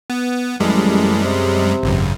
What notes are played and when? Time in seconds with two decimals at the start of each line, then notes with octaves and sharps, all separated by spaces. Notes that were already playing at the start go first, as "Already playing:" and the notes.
0.10 B3
0.60 A1 F#2 G3 G#3
1.24 C3
1.83 G#1 C#2 F#2